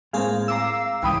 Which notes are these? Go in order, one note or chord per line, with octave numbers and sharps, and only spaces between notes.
A2 G#3 A#3 C4 G#4 F5
F5 A#5 D6 E6
C2 G#2 C#3 E3 G5 B5 D#6